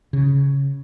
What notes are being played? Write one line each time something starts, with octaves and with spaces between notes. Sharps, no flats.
C#3